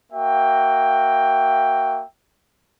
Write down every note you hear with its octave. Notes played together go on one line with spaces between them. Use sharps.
A#3 F#4 E5 G5